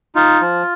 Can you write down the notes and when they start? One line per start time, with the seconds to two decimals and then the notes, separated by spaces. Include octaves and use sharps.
0.15 D#4 F4
0.41 F3